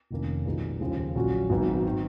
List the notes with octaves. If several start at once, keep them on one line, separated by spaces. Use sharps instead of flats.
F1 F2 D#3 A#3 C#4
B1 A#2 G#3 B3 D#4
D#2 C#3 F3 G#3
A#1 A#2 F#3 C#4 F#4
G#1 G#2 F#3 B3
D#3